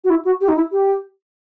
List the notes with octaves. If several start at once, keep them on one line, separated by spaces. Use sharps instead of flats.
F#4
E4
F#4
G4
D#4
E4
G4